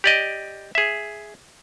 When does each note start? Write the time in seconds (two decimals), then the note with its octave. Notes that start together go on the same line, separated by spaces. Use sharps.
0.04 G4 D5 D#5
0.75 G#4 E5